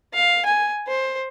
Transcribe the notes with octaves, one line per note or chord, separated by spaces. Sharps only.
F5
G#5
C5